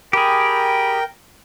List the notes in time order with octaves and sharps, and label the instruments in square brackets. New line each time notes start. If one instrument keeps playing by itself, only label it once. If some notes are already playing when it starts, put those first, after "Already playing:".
[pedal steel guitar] G4 G#4 [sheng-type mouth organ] A#4 G5 [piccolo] B5